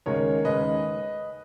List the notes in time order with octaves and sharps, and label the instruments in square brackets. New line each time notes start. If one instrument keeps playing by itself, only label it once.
[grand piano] D#2 C#3 G#3 A#4 C#5
D#2 C#3 G#3 B4 D#5